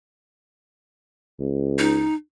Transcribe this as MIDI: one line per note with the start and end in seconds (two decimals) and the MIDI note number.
1.40 2.07 37
1.79 2.14 63